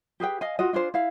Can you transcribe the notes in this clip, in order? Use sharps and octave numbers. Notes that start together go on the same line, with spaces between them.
G4 G#4 B4 G5
D#5 F5 G#5
F4 F#4 D#5
D4 F4 G#4 C5
E4 F5